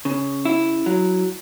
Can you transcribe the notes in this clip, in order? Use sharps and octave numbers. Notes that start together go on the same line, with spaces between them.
C#3
E4
F#3